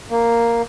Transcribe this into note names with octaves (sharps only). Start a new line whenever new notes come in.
A#3